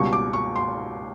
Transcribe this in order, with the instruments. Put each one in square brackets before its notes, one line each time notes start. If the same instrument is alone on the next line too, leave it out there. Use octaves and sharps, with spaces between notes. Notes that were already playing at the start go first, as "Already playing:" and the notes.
Already playing: [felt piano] C#2 B2 G3 C#6
D6
C#6
C6